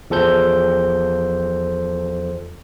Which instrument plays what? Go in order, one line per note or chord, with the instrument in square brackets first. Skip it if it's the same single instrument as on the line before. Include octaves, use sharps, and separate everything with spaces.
[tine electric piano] E2 F3 A4 C5 G6